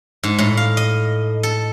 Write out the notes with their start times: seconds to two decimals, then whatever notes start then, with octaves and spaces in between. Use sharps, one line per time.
0.23 G#2
0.38 A2
0.57 F5
0.77 D#5
1.43 A4